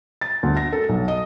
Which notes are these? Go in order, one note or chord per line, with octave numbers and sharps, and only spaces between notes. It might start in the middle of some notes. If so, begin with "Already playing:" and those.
A6
D2
A#6
A4
B1
D#5